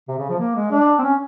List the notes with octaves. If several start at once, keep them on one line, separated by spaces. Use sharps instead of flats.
C3
C#3
F3
A#3
G#3
D4
C4
C#4